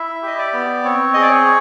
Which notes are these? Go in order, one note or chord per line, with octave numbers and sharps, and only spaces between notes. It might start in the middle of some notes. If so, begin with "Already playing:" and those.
Already playing: E4 E5
G4 D#5
D5
B3
C4 C#5
G#4 D#5
D5
C#5